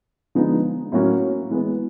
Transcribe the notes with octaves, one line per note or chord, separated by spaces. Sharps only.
D3 F3 G#3 B3 D#4
A2 F#3 A#3 C#4 F#4
E3 G#3 B3